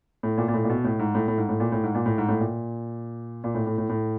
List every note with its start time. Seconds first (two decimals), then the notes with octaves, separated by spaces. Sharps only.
0.23 A2
0.38 A#2
0.48 A#2
0.54 A2
0.64 A#2
0.69 B2
0.84 A2
0.99 G#2
1.15 A2
1.28 A2
1.38 G#2
1.49 A2
1.60 A#2
1.72 A2
1.83 G#2
1.95 A#2
2.06 A2
2.18 G#2
2.28 A2
2.40 A#2
3.44 A#2
3.55 A2
3.67 A2
3.78 A2
3.89 A2